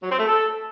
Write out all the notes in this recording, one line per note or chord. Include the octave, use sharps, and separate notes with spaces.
F#3
C4
A3
A4